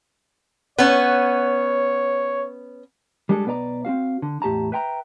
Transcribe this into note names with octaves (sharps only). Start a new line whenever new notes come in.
B3 C#4 C#5
G3 G#3 D4 G#4 A4
B1 B3 B4 D5 A#5
C4 C#4 F#4 F5
D3
E2 A2 G4 A5 A#5
B4 E5 G5 A5 A#5